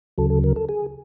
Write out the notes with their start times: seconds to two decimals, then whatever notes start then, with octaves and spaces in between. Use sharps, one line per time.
0.18 D2 C#3 F#3 A4
0.30 A4
0.44 A#4
0.56 A4
0.69 G#4